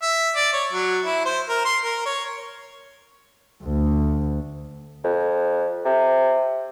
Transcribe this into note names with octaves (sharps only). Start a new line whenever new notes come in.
E5
D5
C#5
F#3
E4
C5
A#4
C6
A#4
C#5
D2
F2
C3